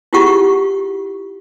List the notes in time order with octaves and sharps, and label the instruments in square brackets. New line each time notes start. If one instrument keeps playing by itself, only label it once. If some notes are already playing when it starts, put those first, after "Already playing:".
[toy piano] E4 F4 G4 G#4 F#5 C#6